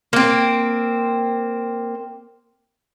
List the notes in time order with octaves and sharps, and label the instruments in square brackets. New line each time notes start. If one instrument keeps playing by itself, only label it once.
[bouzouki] A#3 C4